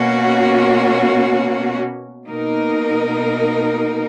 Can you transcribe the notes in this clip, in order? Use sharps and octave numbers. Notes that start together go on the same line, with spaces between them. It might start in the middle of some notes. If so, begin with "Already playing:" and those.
Already playing: B2 A#3 C#4 F#4
B2 A#3 D#4 A#4